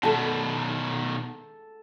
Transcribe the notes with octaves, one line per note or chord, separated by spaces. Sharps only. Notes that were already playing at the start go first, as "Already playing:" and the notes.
B2 D#3 A4 A5